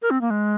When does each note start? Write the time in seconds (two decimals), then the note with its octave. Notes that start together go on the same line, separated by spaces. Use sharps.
0.02 A#4
0.11 C4
0.21 A#3
0.30 G#3